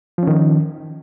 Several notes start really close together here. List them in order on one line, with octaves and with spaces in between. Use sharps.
F3 C#4 D#3